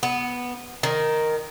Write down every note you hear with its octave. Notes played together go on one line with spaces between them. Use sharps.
B3
D#3